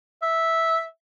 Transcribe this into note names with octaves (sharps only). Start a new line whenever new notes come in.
E5